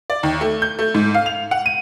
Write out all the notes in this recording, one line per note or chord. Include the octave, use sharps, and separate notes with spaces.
D5
D#2
A3
G6
A3
G#2
F5
F7
F#5
D#7